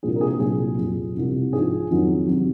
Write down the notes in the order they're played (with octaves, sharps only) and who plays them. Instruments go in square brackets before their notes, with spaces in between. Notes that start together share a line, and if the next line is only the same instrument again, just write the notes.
[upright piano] C2 A#2 F3 G#4
A#4
G#4
C2 A#2 F#3 G#4
F2 C3 F#3
C2 C3 F3
G#2 F3 G#4
F2 D#3 F#3
C3 F#3